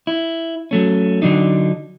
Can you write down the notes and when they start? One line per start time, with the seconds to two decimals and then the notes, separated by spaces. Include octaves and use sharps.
0.07 E4
0.71 F#3 A3 C#4
1.22 D3 F#3 D4 D#4